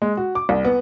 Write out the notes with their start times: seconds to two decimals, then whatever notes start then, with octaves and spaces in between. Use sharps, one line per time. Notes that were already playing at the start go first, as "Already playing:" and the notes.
0.02 G#3
0.17 F#4
0.35 D6
0.49 C2
0.65 B3